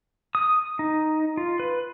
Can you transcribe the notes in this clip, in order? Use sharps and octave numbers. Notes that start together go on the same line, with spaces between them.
D#6
D#4
F4
B4